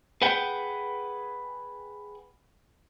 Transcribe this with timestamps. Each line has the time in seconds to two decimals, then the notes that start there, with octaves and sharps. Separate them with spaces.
0.22 G#4 B4 F#5 G5